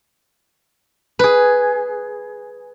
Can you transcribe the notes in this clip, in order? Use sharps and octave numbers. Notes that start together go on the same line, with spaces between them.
G#4 B4